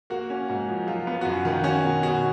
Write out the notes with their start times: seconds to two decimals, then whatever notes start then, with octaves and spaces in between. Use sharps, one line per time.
0.10 A#3 F#4
0.30 C#4
0.48 G#2 F#4
0.68 F3
0.87 F#3 F4
1.07 B3
1.21 F#4
1.25 F#2 F4
1.45 D#3
1.64 C#4 F#4
1.84 B2
2.03 B2 F#4